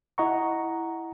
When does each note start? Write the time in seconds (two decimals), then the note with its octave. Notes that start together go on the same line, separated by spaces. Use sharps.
0.18 E4 D#5 F#5 A#5 C#6